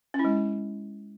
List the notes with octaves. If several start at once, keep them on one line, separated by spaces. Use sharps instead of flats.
C#4
E4
G#3